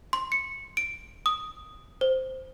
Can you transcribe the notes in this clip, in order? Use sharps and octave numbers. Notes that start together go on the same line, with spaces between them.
C6
C#7
D7
D#6
C5